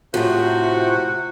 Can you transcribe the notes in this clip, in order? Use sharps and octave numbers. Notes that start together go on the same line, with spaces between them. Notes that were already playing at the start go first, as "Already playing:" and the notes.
A2 C3 F3 F#4